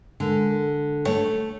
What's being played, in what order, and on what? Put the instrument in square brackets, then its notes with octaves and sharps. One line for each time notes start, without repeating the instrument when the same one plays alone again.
[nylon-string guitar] D3 [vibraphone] G#3 A4 A#4
[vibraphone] A4
[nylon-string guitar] A3 C#5